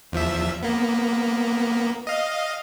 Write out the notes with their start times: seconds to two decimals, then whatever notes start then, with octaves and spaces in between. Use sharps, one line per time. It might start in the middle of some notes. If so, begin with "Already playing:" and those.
0.12 E2 F3 E5
0.62 A#3 B3
2.07 D#5 F5